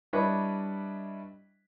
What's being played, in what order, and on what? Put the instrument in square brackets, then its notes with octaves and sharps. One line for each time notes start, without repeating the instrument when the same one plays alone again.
[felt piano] G3 D4 E4 B4 C#5 D#5